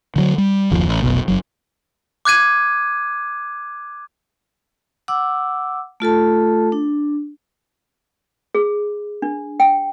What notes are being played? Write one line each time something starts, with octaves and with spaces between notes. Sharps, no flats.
D3 D#3 F#3
G3
F#1 D#2 F3
A1
F1 B1 B2
F#1 F#3
D6 F#6 G#6 D#7
F#5 D6 E6
A3 F4 A4 A5
D4
G#4
D4
G5